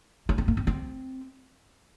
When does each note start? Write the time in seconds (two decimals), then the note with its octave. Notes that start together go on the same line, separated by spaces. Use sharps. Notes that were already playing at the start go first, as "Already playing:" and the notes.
0.29 C#4
0.38 C4
0.48 A#3
0.57 C4
0.67 C4